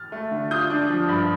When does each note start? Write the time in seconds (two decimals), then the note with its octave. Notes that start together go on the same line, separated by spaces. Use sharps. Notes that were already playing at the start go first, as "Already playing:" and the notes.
Already playing: F6 A6
0.12 A3
0.31 D3
0.51 F4 D#6 G6
0.70 D4
0.89 F3
1.08 G2